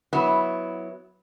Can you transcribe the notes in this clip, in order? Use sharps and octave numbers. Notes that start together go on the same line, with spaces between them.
F#3 B3 E4